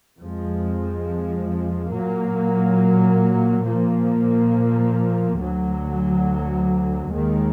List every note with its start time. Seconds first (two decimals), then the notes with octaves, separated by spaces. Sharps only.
0.17 F2 F3 G#3
1.91 A#2 F#3 A#3
3.63 A#2 F3 A#3
5.37 D2 D3 F#3
7.10 D#2 D#3 G#3